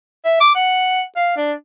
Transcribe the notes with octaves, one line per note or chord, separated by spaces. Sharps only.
E5
D6
F#5
F5
D4